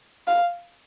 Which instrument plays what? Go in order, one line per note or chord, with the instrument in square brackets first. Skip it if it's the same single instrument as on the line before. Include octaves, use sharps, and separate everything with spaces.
[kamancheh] F5